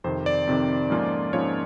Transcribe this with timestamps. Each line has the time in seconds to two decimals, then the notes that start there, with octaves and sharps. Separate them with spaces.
0.04 F2 C3 D#3 C5
0.26 D5
0.47 F2 C3 D#3
0.90 G#2 F3 A#3 C#4 F4
1.33 G#2 F3 A#3 C#4 F4 C#5